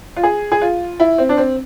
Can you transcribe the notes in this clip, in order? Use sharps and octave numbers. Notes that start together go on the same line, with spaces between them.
F4
G#4
G#4
F4
E4
C4
D4
C4